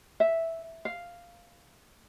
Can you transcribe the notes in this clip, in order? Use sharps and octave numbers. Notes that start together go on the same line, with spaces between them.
E5
F5